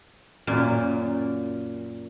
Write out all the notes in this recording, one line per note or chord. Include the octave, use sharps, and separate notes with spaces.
F#2 A#2